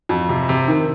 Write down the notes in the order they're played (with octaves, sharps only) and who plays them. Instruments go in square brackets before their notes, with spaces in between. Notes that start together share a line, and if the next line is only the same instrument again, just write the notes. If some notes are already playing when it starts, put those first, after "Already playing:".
[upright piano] F2
C3
C3
D#3